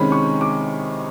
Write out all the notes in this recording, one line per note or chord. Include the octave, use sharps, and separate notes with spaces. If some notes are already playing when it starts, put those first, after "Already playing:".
Already playing: C3 D#3 G#3 C#4 B5
C#6
D6